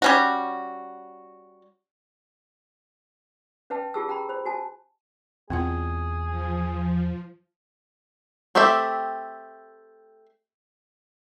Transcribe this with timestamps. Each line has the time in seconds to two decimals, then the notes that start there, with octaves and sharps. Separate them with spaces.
0.02 G3 C#4 F#4
3.70 C#4 B4 E5 G5 A5
3.94 F4 G4 G#4 A5 E6
4.08 G4 G5 A#5 B5
4.29 C5 B5
4.45 F#4 G#5 A5
5.50 E2 B2 C4 F4 G#4 F#5
6.28 F3
8.55 A3 C4 G4 A4 E5